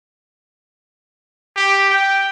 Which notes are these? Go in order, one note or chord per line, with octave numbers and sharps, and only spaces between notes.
G4
G5